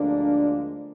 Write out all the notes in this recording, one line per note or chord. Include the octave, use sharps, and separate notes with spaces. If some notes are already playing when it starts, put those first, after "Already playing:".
Already playing: D2 D3 F3 G#3 A#3 D4